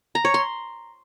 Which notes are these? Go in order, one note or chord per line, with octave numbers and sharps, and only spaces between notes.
A#5
C#5
C6